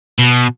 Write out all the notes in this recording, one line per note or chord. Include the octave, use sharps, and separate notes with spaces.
B2